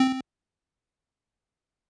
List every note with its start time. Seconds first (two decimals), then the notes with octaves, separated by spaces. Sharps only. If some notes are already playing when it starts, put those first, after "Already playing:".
Already playing: C4